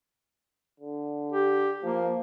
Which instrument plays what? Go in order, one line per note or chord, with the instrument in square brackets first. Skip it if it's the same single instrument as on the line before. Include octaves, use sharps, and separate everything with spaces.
[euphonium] D3
[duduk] G4
[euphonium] F3 [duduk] A#3